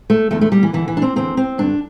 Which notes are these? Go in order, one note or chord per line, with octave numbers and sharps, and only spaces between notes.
A3
E2 D3 A3
A3
G3
E3
E2 D3 E3
E3
D4
C4
E2 D3 C4
C4
G2 D3 D4